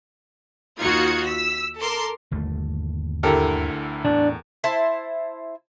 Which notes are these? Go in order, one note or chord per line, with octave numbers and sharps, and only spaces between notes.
D#2 D#4 F4 F#4 G#6 C#7
E6 B6
A4 A#4 C6 D6
G1 D#2 A3
D2 D3 E4 G4 A4 A#4
E2 A2 D4
E4 C5 A5